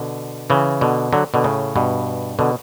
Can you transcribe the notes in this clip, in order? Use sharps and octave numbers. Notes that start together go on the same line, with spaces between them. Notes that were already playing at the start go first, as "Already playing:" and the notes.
Already playing: B2 D3
C#3 E3
B2 D3
D3 F#3
B2 D3
A2 C#3
G2 B2
B2 D3